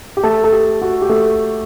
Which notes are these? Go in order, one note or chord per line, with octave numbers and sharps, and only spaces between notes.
G4
A3 A4
A4
G4
F#4
G4
A3 A4